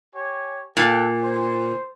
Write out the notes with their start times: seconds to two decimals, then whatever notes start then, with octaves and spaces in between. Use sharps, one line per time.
0.15 G4 C#5 G#5
0.77 A#2 A4 F#5 G5
1.23 C5